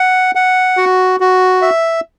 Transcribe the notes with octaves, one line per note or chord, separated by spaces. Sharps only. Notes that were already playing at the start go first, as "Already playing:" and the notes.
Already playing: F#5
F#5
F#4
F#4
E5